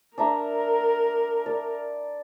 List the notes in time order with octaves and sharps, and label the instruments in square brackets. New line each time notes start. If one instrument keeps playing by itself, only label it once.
[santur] D4 E5 A#5 [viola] A#4
[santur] D5